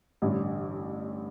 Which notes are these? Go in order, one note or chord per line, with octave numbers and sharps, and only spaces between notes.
A1 G2 D3